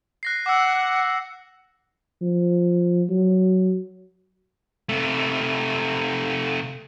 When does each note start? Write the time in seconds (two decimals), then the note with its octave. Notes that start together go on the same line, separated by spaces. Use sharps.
0.23 F#6 A#6 C7
0.46 F#5 D6 E6
2.21 F3
3.10 F#3
4.89 C3 A3